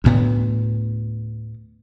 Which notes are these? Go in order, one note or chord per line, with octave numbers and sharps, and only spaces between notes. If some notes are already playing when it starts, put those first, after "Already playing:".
D2 A2 B3